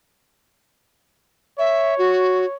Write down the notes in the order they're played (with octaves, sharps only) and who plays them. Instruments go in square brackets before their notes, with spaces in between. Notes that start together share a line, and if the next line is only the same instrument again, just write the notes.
[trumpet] C#5 [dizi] E5
[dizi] F#4